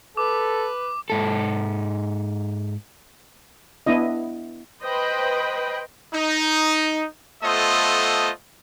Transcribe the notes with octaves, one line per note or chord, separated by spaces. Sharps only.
A4 B4 D6
G#2 A4
B3 D4 E4 D#5
B4 C5 D#5 G5 B5
D#4
A3 B3 F4 A4 C5 D#5